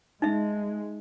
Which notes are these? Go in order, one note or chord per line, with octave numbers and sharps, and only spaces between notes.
G#3 D#4 E5